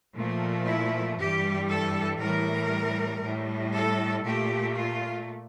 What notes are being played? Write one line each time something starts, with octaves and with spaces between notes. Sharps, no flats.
A#2 F3 A3
E4
G2 E3 G3 G4
A4
A2 E3 G3 A#4
A2 G3
A4
A#2 A3 G4
F4